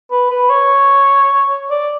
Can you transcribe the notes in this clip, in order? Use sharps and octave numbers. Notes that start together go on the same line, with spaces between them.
B4
B4
C#5
D5